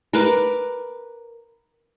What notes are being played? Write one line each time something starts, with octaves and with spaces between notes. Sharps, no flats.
A#4 B4 D6